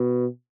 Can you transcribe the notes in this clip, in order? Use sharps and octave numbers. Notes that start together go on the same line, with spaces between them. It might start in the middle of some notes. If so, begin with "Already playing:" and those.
Already playing: B2